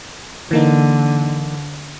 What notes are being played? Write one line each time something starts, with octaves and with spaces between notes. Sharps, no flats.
D3 E3 A#3 D#4